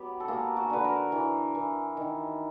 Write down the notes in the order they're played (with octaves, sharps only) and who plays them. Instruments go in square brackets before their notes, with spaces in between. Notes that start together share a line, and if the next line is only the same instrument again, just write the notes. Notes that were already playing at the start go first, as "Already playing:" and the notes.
Already playing: [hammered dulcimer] F#3 B3 G4
A4
A#3 G#4
F#4
D3 B4
A#4
E3
E3
D#3